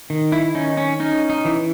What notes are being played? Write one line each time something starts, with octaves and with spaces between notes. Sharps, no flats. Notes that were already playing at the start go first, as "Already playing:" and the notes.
D#3
E4
C#4 D#4
C#4
C#4 D#4
D#4
E3